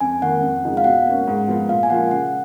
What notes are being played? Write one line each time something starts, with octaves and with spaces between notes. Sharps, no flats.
F2 G#5
D#3 A#3 F#5
F2
C#3 F3 G#3 D#4
F5
B2 F#5
A#3 C#4
G#2
F3 B3 F4
A#2 F5
G#5
F3 A#3 F4 F#5
C#3 F#5